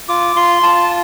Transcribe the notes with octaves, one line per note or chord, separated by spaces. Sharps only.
F4 D6
F4 C6
F4 A5